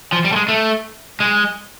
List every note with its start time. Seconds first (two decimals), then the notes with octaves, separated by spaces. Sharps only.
0.12 F3
0.25 G3
0.32 A3
0.36 G#3
0.48 A3
1.20 G#3